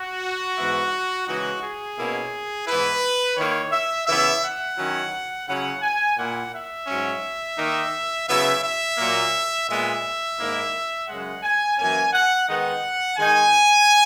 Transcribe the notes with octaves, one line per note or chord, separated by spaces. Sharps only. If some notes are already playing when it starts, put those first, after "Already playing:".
Already playing: F#4
G#2 E3 B3 E4
C#3 E3 G#3 D#4 F#4
G#4
B2 A#3 C#4 E4
G#2 E3 B3 E4 B4
D#3 A#3 E4 C#5
E5
C#3 E3 B3 E4 E5
F#5
D#3 F#3 C#4 E4
C#3 F#3 C#4 E4 F#5
G#5
A#2 A#3 E4 F#5
E5
G#2 F#3 C#4
D#3 A#3 D#4
C#3 F#3 B3 E4 E5
E5
A#2 F#3 A#3
A#2 G#3 B3 E5
G#2 D#3 A#3 E4
F#2 C#3 G#3 F#5
G#5
F#2 E3 A#3 C#4 G#5
F#5
D#3 G#3 B3 D#4 F#5
D#3 G#3 D#4 G#5